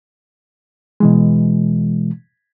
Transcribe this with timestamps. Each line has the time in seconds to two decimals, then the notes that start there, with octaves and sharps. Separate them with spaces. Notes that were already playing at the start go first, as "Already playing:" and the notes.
1.00 B2 E3 G#3